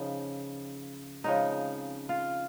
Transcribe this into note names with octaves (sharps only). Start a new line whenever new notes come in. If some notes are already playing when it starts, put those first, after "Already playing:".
Already playing: C#3 F3 D#4
C#3 F3 G#3 C4 D#4
F4